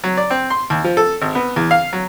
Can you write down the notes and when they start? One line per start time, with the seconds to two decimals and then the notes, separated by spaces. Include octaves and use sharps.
0.04 F#3
0.17 D5
0.30 C4
0.50 C6
0.70 D#2
0.84 F3
0.97 A4
1.22 G#1
1.35 B3
1.56 E2
1.71 F5
1.93 F#3